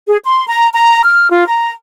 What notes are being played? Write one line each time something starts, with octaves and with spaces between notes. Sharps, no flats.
G#4
C6
A#5
A#5
F6
F4
A#5